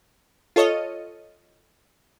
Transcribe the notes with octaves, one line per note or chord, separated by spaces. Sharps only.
F4 A4 C#5 D#5